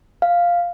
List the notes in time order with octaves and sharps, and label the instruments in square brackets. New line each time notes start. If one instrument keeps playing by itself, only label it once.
[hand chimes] F5